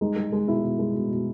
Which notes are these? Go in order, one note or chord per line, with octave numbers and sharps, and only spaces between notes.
G#3 D#4
G#3
G#3
B2 E4
B2
G#3
B2
B2